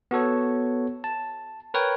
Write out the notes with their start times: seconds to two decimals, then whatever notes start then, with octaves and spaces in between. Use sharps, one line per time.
0.11 B3 F#4 A4 C#5
1.04 A5
1.74 A#4 B4 C#5 G5